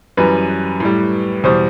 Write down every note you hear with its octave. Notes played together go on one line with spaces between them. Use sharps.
F#2 E3 G3 B4
A2 G3
E2 B2 G3 C5